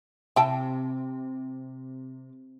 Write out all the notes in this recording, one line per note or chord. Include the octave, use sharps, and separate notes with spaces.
C3 E4 G5 A5